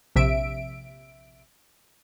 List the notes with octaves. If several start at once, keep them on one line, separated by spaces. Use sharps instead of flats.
A#1 C3 E5 D7